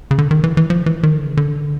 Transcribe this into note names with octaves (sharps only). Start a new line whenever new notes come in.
C#3
D3
D#3
E3
E3
F3
E3
D#3
D3
C#3
D3